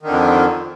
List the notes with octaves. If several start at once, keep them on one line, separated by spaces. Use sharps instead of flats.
F2 D3 D#3